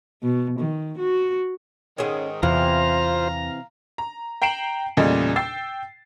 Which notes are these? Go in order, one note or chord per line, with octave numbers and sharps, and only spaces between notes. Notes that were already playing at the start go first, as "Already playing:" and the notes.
B2
D#3
F#4
G#2 D#3 C#4 G#4
E2 C3 E3 F4 C5 F5 A#5
A#5
G5 A#5 C7 D7 E7 F#7
E2 A#2 C#3 G3 A3 D#5
G5 E6 A6 C7